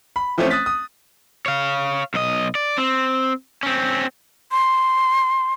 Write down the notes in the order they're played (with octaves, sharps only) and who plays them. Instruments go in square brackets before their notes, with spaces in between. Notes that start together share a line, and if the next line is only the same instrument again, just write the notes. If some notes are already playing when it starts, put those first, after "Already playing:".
[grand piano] B5
E3 F3 A3 C4 C#4
D#6 F#6 A6 B6
D#6
[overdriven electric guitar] C#5 F5
B1 D#5
D5
C4
C4 C#4
[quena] C6